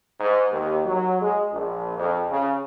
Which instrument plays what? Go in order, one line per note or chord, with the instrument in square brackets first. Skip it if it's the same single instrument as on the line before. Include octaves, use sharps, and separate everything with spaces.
[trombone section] G#2
D#2
F#3
G#3
A#1
F2
C#3